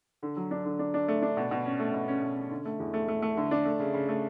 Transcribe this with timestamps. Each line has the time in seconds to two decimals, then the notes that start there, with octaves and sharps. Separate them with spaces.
0.23 D3
0.37 F#3
0.51 D4
0.65 D3
0.79 D4
0.94 D4
1.08 A3
1.22 D4
1.37 B2
1.51 B2
1.66 C#4
1.79 A3
1.94 B2
2.08 C#4
2.22 B2
2.37 C#4
2.51 D3
2.65 A3
2.80 E2
2.94 A3
3.08 A3
3.22 A3
3.37 D3
3.51 D4
3.65 A3
3.80 C#3
3.94 C#3
4.08 A3